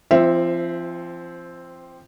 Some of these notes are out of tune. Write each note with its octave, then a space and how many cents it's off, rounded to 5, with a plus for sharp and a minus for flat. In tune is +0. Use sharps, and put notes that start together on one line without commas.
F3 -30 C4 +0 E5 +0